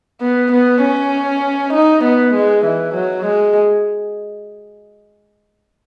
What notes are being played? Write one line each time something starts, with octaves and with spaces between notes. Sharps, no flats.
B3
B3
C#4
D#4
B3
G#3
E3
F#3
G#3